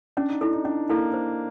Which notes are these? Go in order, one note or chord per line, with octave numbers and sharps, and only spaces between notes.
C#4 D4
D#4
D4 E4 A4
D#4
C#4 D4
A#3 E4 A4
C5